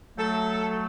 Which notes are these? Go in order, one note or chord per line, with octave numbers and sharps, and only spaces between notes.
F#3 A3 A4